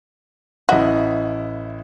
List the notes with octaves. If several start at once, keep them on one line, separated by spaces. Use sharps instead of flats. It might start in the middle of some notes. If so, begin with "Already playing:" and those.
A1 E4 F#4 D#5